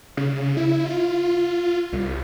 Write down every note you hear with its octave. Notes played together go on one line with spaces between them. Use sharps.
C#3
E4
F4
C2